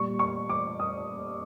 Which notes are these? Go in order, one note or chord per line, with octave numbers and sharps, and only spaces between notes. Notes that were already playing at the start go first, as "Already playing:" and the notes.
Already playing: A#2 G3 C#6
C#6
D6
D#6